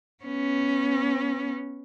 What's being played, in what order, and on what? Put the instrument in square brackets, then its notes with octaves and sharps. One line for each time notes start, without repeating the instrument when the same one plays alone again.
[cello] B3 C#4